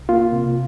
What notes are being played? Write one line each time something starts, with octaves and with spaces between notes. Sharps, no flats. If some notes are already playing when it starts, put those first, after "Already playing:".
Already playing: C2
A#3 F4
C3